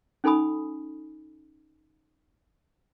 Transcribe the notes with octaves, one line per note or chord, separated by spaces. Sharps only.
C#4 D#4 A4 G#5 B5 D#6